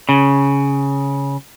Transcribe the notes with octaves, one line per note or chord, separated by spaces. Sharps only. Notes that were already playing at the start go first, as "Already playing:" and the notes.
C#3